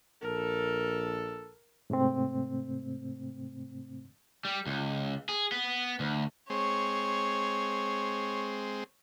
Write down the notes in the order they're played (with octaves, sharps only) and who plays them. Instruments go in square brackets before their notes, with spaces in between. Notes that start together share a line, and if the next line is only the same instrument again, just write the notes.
[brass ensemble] A#1 A4 [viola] A#4
[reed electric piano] G#2 C3 A3 C4
[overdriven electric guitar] G3
C#2
G#4
B3
D2
[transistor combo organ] G#3 C4 [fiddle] C#5